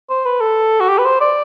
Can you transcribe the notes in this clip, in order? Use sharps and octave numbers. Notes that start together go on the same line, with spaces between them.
C5
B4
A4
F#4
G4
B4
C5
D5